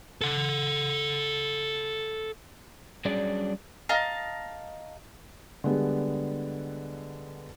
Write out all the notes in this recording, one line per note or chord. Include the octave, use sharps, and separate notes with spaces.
A4 F#5
F#3 G3 C#4 D4 G#4 D5
D#5 F5 A5 A#5
D3 G3 G#3 B3